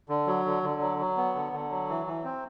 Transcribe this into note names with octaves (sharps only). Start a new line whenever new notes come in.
D3
F#3
D3
D3
F#3
F#3
B3
D3
D3
F#3
E3
E3
C4